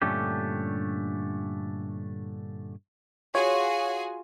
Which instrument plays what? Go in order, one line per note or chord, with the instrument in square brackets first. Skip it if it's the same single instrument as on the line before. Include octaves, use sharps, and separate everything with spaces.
[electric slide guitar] G2 A#2 D3 A3 C#4 G4
[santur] F4 [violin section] F#4 G#4 G#5 [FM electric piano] C#5